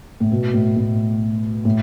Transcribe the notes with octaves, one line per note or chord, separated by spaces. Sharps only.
A2
B2
A2
A2
A2